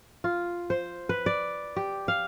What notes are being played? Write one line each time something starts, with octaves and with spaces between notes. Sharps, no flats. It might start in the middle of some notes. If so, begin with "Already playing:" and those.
F4
C5
B4
D5
G4
F5